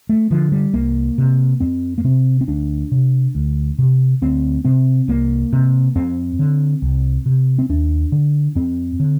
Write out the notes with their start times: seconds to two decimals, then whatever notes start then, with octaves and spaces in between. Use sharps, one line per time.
0.09 A3
0.31 D3 F3
0.52 G3
0.74 C2 A#3
1.18 C3
1.60 F2 C4
1.98 A#3
2.04 C3 C4
2.41 C4
2.48 D2 D4
2.91 C3
3.35 D2
3.79 C3
4.22 D2 C4
4.65 C3 C4
5.08 C2 A#3
5.53 C3
5.96 F2 C4
6.39 D3
6.82 C2
7.26 C3
7.59 C4
7.69 D#2 D4
8.12 D3
8.56 F2 C4
9.00 D3